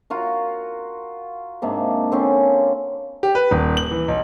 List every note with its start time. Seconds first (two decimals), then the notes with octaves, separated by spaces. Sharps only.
0.10 F4 F#4 A#4
1.62 G#2 C3 A#3 D4
2.12 D3 C4 C#4 F4
3.23 G4
3.35 B4
3.51 D#1
3.77 F#7
3.91 E3
4.08 B1